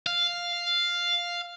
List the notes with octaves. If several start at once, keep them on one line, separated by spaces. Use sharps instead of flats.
F5